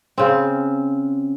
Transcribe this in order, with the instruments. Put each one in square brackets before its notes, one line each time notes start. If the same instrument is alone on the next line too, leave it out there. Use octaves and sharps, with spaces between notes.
[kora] C#3 C4